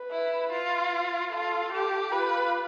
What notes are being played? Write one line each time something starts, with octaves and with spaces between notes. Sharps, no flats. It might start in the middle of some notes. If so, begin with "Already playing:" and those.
Already playing: B4
E4
F4
F4 A4
G4
F4 B4